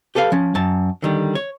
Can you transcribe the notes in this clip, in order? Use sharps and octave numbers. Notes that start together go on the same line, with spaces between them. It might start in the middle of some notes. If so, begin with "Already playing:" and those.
G4 A4 B4 F5
F3 C#4
F#2 A5
D3 D#3 G3
C#5